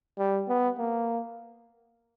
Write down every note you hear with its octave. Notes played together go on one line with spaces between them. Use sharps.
G3
B3
A#3